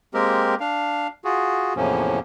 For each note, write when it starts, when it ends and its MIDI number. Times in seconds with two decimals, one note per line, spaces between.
0.14 0.55 56
0.14 0.55 58
0.14 0.55 60
0.14 0.55 67
0.14 0.55 70
0.60 1.08 62
0.60 1.08 77
1.24 1.73 65
1.24 1.73 66
1.24 1.73 68
1.76 2.19 40
1.76 2.19 45
1.76 2.19 48
1.76 2.19 53
1.76 2.19 58
1.76 2.19 61